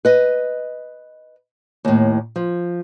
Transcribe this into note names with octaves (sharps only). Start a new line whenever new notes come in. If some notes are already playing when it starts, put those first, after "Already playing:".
B4 D#5
D#2 A2
F3